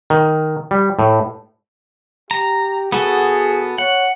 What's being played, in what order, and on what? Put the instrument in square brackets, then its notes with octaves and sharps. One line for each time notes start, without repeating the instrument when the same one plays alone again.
[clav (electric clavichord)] D#3
G3
A2
[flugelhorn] G4 [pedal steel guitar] A#5
[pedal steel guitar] B3 F#4 A4 [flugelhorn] G#4
[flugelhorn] C#5 [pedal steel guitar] F#5